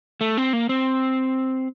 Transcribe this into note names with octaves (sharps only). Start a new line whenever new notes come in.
A3
C4
A#3
C4